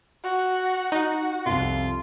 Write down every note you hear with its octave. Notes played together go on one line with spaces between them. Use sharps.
F#4
D#4 F#4
C2 F2 F4